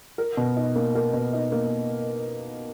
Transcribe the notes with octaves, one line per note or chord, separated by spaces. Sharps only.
A#4
B2
D#4
A#3
A#4
B2
D#4
A#3